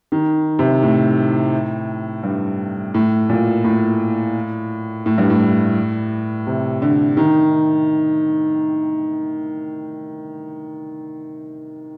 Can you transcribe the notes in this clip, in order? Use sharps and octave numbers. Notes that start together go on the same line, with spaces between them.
D#3
C3
A2
G2
A2
A#2
A2
A2
G2
A2
C3
D3
D#3